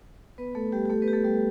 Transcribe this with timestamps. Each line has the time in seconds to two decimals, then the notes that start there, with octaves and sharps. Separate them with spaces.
0.38 B3 B4
0.55 A3 A4
0.72 G3 G4
0.86 G4
0.89 A3 A4
1.02 B3 B4
1.08 G4
1.13 A3 A4
1.24 G3 G4